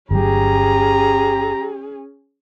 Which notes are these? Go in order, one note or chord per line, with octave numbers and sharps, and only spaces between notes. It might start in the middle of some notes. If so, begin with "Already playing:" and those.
G1 F#3 C#4 G4 G#4 A#5